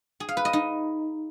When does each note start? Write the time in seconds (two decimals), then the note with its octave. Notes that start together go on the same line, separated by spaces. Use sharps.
0.20 G#4
0.29 F5
0.37 B4
0.45 D#5
0.53 D#4